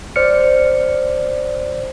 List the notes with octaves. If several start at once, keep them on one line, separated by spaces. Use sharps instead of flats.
C5 D5 F6 C#7